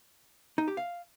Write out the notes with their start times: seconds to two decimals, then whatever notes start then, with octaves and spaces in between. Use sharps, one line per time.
0.58 D#4
0.68 G4
0.77 F5